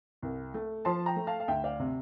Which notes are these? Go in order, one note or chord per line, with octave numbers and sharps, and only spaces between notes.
C2
A3
F3 A5 C6
G5 A#5
A3
F5 A5
F5
D2 E5 G5
D5 F5
C3